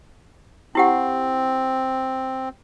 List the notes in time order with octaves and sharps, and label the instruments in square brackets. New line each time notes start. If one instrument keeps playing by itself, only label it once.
[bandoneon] C4 [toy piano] E4 G4 F#5